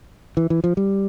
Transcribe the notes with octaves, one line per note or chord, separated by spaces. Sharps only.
E3
E3
F3
G3